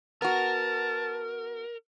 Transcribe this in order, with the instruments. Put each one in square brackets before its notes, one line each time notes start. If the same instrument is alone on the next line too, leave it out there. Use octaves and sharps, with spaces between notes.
[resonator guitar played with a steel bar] B3 F#4 [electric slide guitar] A#4 [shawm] A5